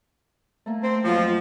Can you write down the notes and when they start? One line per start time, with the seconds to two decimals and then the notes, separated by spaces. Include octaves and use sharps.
0.66 A3 A#3
0.83 C4
1.05 F2 F3 F#3